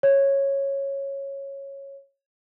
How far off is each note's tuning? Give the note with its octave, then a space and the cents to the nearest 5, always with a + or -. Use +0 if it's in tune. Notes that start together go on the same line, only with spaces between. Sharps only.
C#5 -10